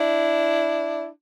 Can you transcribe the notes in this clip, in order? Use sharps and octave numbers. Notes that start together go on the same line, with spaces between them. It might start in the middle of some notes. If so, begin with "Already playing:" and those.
Already playing: D4 E4